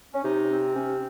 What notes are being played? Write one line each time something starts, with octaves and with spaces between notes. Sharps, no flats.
C#4
C3 D#4
C4
C3 C#4